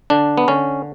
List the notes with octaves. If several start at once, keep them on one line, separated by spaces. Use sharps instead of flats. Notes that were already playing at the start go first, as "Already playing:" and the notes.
D3 D4
B3
D3 C#4